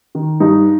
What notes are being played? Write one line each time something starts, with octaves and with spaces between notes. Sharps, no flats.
D#3
G2 D#4